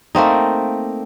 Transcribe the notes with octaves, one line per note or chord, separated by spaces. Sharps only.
A3 A#3 C4 D#4